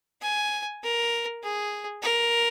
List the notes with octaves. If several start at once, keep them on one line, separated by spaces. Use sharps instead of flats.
G#5
A#4
G#4
A#4